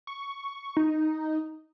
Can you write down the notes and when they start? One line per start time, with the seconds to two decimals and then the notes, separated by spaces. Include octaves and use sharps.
0.07 C#6
0.77 D#4